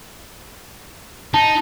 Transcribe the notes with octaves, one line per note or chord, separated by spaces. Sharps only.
D#4 A5